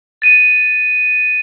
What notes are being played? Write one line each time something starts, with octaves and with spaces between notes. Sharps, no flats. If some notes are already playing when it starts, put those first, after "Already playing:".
A6 D#7